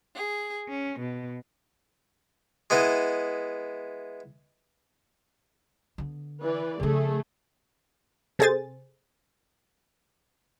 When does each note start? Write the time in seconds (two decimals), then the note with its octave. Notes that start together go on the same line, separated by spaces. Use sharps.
0.15 G#4
0.70 C#4
1.01 B2
2.70 G#3 B3 E4 D#5
5.98 D3 B3
6.42 E3 B4 D5
6.80 C#3 F3 A3 G#4
8.39 C3 G#4 A4 C5 G#5 A6